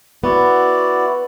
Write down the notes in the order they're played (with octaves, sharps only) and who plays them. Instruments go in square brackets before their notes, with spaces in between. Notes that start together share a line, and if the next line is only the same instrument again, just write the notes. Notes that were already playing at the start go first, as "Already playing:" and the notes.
[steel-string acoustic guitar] B3 [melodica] E4 F#4 D5